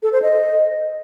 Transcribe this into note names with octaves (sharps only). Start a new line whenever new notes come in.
A4
C5
D#5